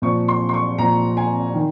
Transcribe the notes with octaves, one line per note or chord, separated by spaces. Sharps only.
A#2 F3 C#6
C6
C6
C#6
A#2 F3 A#5
G#5
D#3